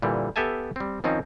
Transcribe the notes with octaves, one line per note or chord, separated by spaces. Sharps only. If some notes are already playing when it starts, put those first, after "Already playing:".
A#2 D3 E3 G3
B3 G4 A4 E5 G#5 A5
G3 C4
D#3 F3 C4 C#4 D#4